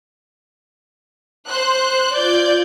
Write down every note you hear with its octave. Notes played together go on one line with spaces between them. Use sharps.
C5 F#6
F4 D5 G6 G#6